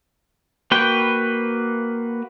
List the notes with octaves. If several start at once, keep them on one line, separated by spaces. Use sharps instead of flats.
A#3 F#4 B4 G5